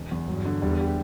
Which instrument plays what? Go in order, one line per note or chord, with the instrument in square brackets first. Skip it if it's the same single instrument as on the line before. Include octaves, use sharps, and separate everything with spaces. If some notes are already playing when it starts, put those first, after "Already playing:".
Already playing: [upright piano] E1
E2
[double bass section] G2 [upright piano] F#3
[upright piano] D3
[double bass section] E2 [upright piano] G3
[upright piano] G4